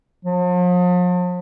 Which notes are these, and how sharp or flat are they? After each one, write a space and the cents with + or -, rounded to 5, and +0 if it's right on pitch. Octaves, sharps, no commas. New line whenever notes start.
F3 +45